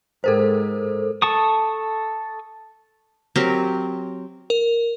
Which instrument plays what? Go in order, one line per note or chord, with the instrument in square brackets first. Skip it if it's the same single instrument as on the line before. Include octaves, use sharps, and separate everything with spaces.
[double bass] G#2 [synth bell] A4 A#4 C5
[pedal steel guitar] A4 A5 C#6 D#6
[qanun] F#3 C4 G4 A#4
[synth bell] A#4